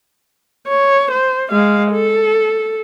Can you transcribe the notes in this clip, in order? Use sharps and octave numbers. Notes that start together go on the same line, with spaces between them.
C#5
C5
G#3 F5
A4